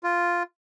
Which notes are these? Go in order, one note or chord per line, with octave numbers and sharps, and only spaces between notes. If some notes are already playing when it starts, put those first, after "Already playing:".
F4